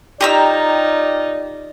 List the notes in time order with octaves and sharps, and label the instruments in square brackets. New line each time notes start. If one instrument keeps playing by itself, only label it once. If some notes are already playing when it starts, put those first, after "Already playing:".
[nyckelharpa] D#4 F4 [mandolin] G4 A#5 E6 [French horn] D5